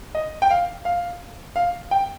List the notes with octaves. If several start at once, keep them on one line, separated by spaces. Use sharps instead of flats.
D#5
G5
F5
F5
F5
G5